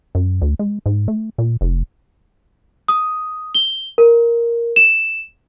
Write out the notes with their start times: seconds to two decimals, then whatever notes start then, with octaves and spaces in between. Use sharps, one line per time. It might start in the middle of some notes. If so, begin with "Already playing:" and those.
0.15 F#2
0.42 D2
0.59 G#3
0.86 G#2
1.08 A3
1.38 A#2
1.61 F1
2.88 D#6
3.55 G7
3.98 A#4
4.76 E7